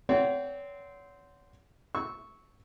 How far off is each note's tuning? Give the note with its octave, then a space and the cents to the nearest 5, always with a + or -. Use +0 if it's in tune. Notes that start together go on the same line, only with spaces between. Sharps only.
C4 -15 C#5 +40 F#5 +0
C#6 +0 E6 -15